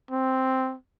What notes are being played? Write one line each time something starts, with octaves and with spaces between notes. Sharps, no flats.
C4